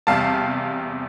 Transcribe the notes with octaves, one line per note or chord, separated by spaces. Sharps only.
E2 C3 G3 F5 A5